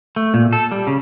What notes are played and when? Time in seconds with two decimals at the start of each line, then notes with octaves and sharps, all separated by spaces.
0.16 A3
0.34 A#2
0.53 A4
0.72 G3
0.87 C#3